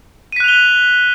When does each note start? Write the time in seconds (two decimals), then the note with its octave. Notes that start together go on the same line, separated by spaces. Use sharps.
0.32 D#7
0.36 B6
0.40 F#6
0.44 F7
0.48 G7